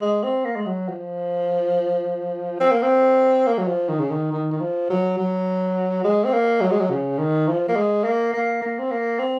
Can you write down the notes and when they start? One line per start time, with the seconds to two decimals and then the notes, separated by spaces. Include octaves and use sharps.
0.01 G#3
0.24 C4
0.45 A#3
0.56 G#3
0.66 F#3
0.88 F3
2.60 C4
2.71 A#3
2.83 C4
3.47 A#3
3.58 F#3
3.68 F3
3.89 D#3
4.00 C#3
4.10 D#3
4.32 D#3
4.52 D#3
4.60 F3
4.90 F#3
5.18 F#3
6.04 G#3
6.25 C4
6.33 A#3
6.61 F#3
6.71 G#3
6.80 F#3
6.90 C#3
7.19 D#3
7.48 F3
7.68 A#3
7.76 G#3
8.04 A#3
8.33 A#3
8.62 A#3
8.79 C4
8.91 A#3
9.19 C4